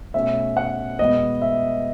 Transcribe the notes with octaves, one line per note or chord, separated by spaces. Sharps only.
B2 A3 C#4 E5
F#5
B2 G#3 B3 D#5
E5